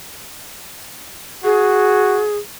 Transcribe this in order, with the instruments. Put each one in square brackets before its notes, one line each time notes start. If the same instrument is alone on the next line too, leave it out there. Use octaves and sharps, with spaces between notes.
[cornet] F#4 [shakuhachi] G#4